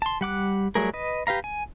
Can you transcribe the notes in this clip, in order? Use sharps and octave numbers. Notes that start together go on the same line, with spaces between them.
A5 C6
G3 F#5 D6 F#6
F#3 G3 A3 G#4 A#4
B4 D#5
G4 B4 F5 A#5
G#5